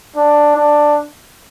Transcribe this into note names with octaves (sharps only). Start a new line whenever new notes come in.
D4
D4